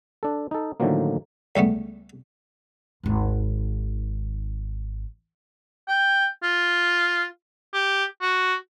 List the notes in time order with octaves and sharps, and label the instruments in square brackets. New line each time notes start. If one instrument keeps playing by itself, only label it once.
[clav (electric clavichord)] D4 A4
D#4 A4
A2 D3 D#3 F3 F#3 A#3
[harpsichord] C#2 G3 A3 B3
[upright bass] G#1 D#2
[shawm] G5
F4
G4
F#4